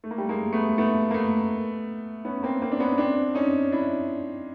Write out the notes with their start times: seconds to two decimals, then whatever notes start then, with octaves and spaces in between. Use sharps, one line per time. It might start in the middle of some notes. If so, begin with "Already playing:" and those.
0.04 A3
0.11 A#3
0.18 G3 A3
0.29 G#3 A#3
0.53 A3 B3
0.78 A3 B3
1.11 A#3
1.14 A3 B3
2.25 B3 C#4
2.43 A#3 C4
2.62 A#3 C4
2.72 D4
2.80 B3 C#4
2.98 C4 D4
3.35 C#4 D#4
3.72 D4 E4